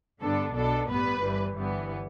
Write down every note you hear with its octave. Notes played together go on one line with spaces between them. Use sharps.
G2 D3 B3 D4 A4
B1 B2 B3 D4 A4
A1 G2 G3 B3 B4
G1 G2 E3 G3
G1 G2 E3 G3 B3